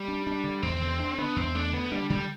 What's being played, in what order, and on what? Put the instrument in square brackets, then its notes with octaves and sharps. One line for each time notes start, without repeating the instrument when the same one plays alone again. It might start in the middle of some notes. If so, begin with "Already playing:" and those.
Already playing: [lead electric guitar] G3
[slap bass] D4
D4
D3
[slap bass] E2 [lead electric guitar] C4
[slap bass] D3
D4
[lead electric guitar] B3 [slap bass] D4
[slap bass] E2 [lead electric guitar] C4
[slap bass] A3 [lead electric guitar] D4
[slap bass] D3 [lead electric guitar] B3
[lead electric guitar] G3 [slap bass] D4
[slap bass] D3 [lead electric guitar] G3